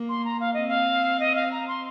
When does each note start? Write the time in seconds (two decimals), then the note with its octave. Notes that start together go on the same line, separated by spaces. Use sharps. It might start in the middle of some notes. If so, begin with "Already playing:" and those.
Already playing: A#3
0.09 C6
0.25 A#5
0.40 F5
0.54 C4 D#5
0.68 F5
1.20 D#5
1.35 F5
1.51 A#5
1.67 C6